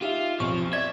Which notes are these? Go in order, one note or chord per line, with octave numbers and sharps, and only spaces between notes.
D#4 F4 G4 E5
B1 F2 F3 C#6
D5 E5 G#6